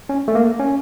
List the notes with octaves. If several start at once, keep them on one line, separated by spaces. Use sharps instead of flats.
C#4
A3
A#3
C#4